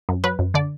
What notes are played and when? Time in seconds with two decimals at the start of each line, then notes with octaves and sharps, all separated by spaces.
0.09 F#2
0.24 F#3 B4
0.39 F#2
0.54 D3 D5